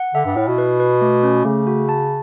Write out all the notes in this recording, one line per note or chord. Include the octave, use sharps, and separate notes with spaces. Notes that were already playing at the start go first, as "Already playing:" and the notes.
Already playing: F#5
D3 E5
G2
A2 E4
B2
B4
B4
A3
C#4
C#3 A3
F#4
A5